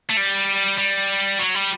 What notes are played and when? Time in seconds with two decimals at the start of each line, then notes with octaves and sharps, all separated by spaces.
0.09 A3
0.17 G3
0.78 G3
1.39 F#3
1.55 G3